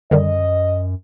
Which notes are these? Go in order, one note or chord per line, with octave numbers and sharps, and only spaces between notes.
F#2 D3 D#3 G3 D#5